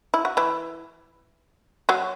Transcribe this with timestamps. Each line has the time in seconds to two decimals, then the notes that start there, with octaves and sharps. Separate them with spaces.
0.14 E4
0.25 F#4
0.37 E3 E4
1.89 F#3 F#4